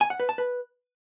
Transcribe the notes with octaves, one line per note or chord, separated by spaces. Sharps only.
G#5
F#5
B4
A5
B4